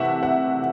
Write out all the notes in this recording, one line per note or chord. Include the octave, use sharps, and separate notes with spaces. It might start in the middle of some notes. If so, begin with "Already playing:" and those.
Already playing: C3 E3 A3 E5 F#5
F#5